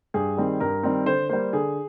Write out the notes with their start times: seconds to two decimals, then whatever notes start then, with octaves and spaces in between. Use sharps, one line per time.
0.14 G2 G#4
0.37 D#3 G3 C4
0.60 G2 A#4
0.83 D#3 G3 C4
1.06 D3 C5
1.29 G3 A#3 C5
1.53 D3 G#4